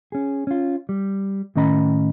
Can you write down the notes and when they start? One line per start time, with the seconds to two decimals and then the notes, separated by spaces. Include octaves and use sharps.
0.12 C#4 G#4
0.47 C#4 F4
0.89 G3
1.56 A2 D#3 C#4 D#5 A#5 B5